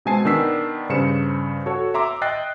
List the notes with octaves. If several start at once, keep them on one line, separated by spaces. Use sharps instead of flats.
B2 G#3 C4 G#5 A5 C7
D#3 B3 D4 E6 B6 C7
G2 C#3 C5 C#7 E7
F#4 A4 C#5
E5 A#5 C6 D6 E6
D#5 G5 F#6 A6 C7